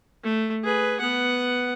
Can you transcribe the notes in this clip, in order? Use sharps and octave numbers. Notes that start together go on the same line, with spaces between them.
A3
G#4 B4
B3 F#5